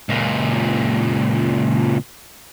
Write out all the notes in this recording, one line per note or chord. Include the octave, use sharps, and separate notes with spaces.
C#2 A#2